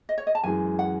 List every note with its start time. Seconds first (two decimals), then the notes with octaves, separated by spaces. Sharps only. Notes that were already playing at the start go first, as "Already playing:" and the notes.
0.09 D#5
0.18 C#5
0.27 D#5
0.35 A5
0.43 F#2 E3 G#3 G#5
0.79 F#5